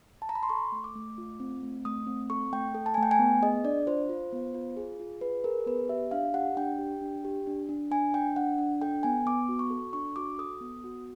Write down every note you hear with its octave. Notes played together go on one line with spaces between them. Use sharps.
A5
A#5
B5
C6
A4 C#6
A3
D6
A3
F4
C4
A3
A3 D#6
C4
A4 C#6
A3 G5
A4
A5
A3 G#5
G5
G#5
B3
G#4 D#5
D4 D5
F4 C5
F4
B3
F4
G#4
F4
G#4 B4
G#4 A#4
B3 B4
G4 E5
D4 F5
G4 F#5
D4 G5
G4
D4
G4
D4
D4
D4 G#5
D4 G5
D4 F#5
D4
A4 G5
B3 G#5
B3 D6
F#4
C#6
A4
D4 C#6
F#4 D6
A4 D#6
B3
F#4